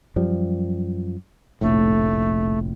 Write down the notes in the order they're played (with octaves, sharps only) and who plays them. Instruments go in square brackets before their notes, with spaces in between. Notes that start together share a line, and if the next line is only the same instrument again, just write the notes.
[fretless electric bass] F#2 F3 G3
[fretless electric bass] F1 A#1 A2 [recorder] A3